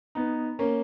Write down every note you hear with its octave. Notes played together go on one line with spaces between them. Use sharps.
B3 D#4
A#3 C#4